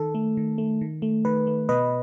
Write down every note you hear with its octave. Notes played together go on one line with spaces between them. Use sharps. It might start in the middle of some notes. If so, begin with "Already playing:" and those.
Already playing: D#3 A4
A3
D#3
A3
D#3
A3
D#3 B4
A3
B2 B4 D#5